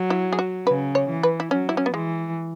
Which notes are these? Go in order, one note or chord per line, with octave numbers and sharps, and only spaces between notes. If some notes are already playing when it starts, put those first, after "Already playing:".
Already playing: F#3
E4
G#4
F#4
C#3 B4
C#5
E3
B4
E4
F#3 C#4
E4
C#4
B3
E3 G#3